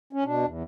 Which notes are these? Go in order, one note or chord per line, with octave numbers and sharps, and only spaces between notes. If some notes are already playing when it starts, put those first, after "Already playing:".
C#4
B2 D4
E2